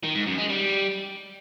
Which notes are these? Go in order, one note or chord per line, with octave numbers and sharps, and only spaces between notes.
D#3
G#2
F#2
G#3
G3